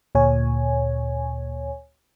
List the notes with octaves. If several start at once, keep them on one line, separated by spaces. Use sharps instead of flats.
D2 A#2 C#5 G#5